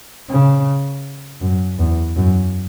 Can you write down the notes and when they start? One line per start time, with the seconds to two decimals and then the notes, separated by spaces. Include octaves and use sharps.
0.30 C#3
1.41 F#2
1.79 E2
2.16 F#2